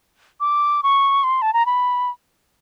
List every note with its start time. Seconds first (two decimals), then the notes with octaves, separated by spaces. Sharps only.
0.40 D6
0.83 C#6
1.24 C6
1.42 A5
1.53 A#5
1.66 B5